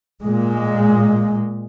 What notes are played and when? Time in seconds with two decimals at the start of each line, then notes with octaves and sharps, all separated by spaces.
0.22 A#2 G#3